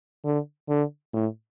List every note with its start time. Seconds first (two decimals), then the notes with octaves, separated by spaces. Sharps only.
0.25 D3
0.69 D3
1.13 A2